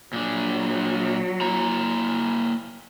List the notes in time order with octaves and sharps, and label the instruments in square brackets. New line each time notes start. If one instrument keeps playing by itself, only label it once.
[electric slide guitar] A#2 D4 [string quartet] F#3
[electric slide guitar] A#3 E4 A#5